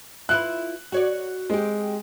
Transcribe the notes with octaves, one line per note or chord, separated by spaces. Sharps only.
E4 F4 B4 F#6
F#4 C#5 D5
G#3 C4 G4